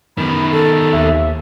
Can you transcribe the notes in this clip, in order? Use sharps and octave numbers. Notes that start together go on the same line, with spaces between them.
F#2 D#3 B3 B5
A4
D#2 E5